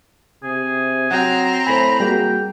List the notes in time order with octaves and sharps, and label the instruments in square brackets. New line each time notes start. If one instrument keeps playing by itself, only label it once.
[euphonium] C3 [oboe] G#4
[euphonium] F#3 [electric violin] C4 A#5 [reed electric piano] F#5 G5
[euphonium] A2 [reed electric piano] C5 G#5 [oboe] B5
[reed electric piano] G3 A#3 F#4 [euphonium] G#4 [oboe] G5